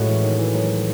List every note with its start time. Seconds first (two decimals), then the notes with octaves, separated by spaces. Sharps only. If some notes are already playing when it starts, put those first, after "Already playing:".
Already playing: A2 G#3 A3 C#4 F#4
0.08 E3
0.23 D#3
0.39 E3
0.55 F#3